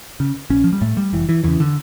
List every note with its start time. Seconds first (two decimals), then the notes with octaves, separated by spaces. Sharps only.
0.20 C#3
0.50 A#1 C#4
0.64 F3
0.73 G3
0.81 A2 A3
0.97 G3
1.13 F1 E3
1.29 E3
1.44 E2 C#3 E3
1.60 D3